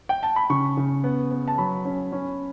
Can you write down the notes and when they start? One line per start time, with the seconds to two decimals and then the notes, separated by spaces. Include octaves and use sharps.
0.09 G5
0.23 A5
0.36 B5
0.50 C#3 C#6
0.77 C#3
1.04 B3
1.31 B3
1.48 A5
1.58 F#3 B5
1.85 C#4
2.12 C#4